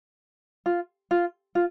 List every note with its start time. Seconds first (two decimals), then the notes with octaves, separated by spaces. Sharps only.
0.66 F4
1.11 F4
1.55 F4